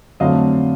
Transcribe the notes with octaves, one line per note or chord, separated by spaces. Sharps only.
F2 D3 F#3 A3 D#5 F5